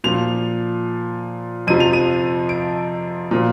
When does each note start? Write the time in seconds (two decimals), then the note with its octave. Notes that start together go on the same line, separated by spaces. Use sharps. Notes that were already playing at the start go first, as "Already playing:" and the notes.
0.04 A#2 F3 F7
1.67 F2 C3 F3 D#7
1.80 F7
1.93 D#7
2.49 D7
3.31 A#2 F3